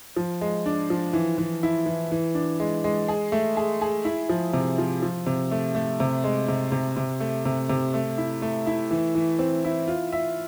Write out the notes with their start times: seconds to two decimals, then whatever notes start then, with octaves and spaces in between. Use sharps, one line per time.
0.16 F3
0.41 G#3
0.66 D4
0.90 F3
1.13 E3
1.38 E3
1.63 E4
1.86 E3
2.12 E3
2.35 D4
2.60 G#3
2.84 G#3
3.08 G#4
3.32 A3
3.57 G#4
3.82 G#4
4.05 E4
4.29 F3
4.53 C3
4.78 F3
5.02 F3
5.26 C3
5.51 A3
5.75 A3
6.00 C3
6.24 G#3
6.48 C3
6.72 C3
6.96 C3
7.20 A3
7.45 C3
7.69 C3
7.94 A3
8.18 E4
8.42 A3
8.67 E4
8.91 E3
9.15 E3
9.39 C4
9.64 E4
9.88 F4
10.12 E5